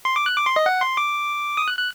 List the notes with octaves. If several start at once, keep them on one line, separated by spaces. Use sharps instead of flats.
C6
D6
F#6
D6
C6
D#5
F#5
C6
D6
D#6
F#6
F#6